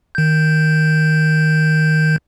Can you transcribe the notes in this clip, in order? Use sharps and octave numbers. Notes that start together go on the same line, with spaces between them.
D#3 G6